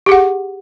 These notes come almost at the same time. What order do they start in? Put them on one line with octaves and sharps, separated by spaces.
G4 G#4 F#5